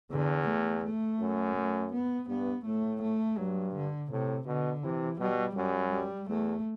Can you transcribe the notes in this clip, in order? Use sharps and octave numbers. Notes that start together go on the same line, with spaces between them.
E2 D3
A3
A3
F#2
A3
B3
G2 B3
A2 A3
A3
G2 F#3
D3
A2 C3
B2 D3
C3 E3
B2 G3
F#2 G3
G3
E2 A3